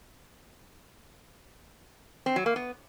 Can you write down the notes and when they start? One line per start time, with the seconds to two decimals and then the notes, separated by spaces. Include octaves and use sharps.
2.26 C4
2.36 F#3
2.46 A#3
2.56 B3